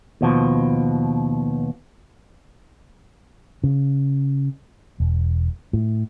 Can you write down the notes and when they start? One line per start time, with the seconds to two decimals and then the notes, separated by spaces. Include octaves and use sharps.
0.21 D#2 B2 F3
3.64 C#3
5.00 E1
5.73 A2